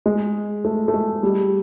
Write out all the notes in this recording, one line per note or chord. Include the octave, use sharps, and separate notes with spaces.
G#3
A3
A3
G#3
G3